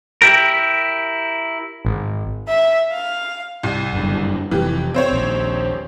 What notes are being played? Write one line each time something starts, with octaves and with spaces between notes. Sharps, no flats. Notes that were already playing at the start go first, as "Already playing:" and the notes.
E4 G4 A#4
G#1
E5
F5
C2
F#1 G2 D3
F1 E3 G4
C4 C5 C#5
A#1 D#2